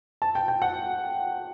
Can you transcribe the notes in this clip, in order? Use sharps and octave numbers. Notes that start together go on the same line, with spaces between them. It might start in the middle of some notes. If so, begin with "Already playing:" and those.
A5
G5
G5
F#5